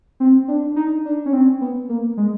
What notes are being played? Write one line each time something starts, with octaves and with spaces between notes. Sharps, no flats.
C4
D4
D#4
D4
C#4
C4
B3
A#3
G#3